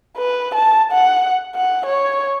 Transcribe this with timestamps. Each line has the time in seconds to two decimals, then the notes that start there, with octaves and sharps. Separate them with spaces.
0.17 B4
0.54 A5
0.92 F#5
1.55 F#5
1.86 C#5